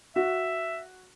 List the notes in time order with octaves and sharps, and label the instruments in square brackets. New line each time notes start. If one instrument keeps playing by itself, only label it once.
[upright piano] F#4 [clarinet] E5